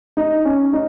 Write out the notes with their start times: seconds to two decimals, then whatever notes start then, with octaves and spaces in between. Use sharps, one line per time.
0.17 D#4
0.45 C#4
0.73 D#4